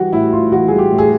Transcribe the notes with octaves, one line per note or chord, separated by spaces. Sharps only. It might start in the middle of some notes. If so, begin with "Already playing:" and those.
Already playing: E3 G3 F#4
A2 E4
A2 F4
E3 F#4
G3 G#4
G4
A2
G#4